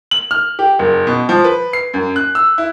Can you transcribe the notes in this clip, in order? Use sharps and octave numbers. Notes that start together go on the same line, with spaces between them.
F#7
F6
G4
F#1
B2
F3
B4
C7
F#2
F#6
E6
E4